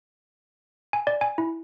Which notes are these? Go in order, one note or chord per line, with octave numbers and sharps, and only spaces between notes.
G#5
D5
G#5
E4